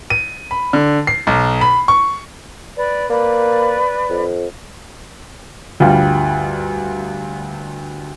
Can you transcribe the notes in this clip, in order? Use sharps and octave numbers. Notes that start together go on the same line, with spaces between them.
D#7
B5
D3
C7
B1
B5
C#6
B4 D5
A#3 B4 D5
F2
D2 G2 G3 F4